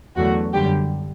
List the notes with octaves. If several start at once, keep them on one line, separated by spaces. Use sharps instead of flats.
E2 D3 F#3 A3 F#4
F#2 D3 G3 G4